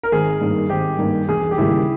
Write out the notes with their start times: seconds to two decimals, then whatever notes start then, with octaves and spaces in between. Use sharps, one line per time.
0.03 A#4
0.12 G#1 G#4
0.41 G2 D#3 A#3
0.69 G#1 G4
0.99 G2 D#3 A#3
1.29 E1 G#4
1.51 G4
1.58 D#2 C#3 G3 A#3 E4